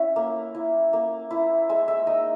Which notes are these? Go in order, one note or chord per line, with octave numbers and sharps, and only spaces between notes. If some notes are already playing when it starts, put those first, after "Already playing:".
Already playing: C#4 E4
A#3
E4
A#3
E4
G#3 E5
E5
D#4 D#5